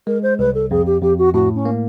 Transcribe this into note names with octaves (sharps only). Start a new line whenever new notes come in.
G#3 A#4
C5
C2 B4
A4
F2 G#4
G4
F2 G4
F#4
A2 F#4
C#4
A#3